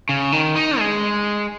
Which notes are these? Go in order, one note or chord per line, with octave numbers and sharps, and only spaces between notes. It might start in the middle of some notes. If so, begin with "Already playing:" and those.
C#3
D#3
D#4
G#3